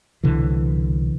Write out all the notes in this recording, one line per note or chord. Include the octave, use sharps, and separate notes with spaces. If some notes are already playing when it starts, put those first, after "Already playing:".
C2 B2 D3 E3